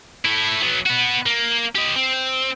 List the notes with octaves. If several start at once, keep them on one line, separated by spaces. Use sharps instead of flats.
A3 E4
F#3 B3
B3 F#4
A#3
G4 D#5
C4